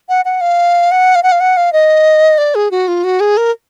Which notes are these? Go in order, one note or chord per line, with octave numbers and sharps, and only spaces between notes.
F#5
F#5
F5
F#5
F5
F#5
F5
F#5
F5
D#5
D5
G#4
F#4
F4
F#4
G#4
A#4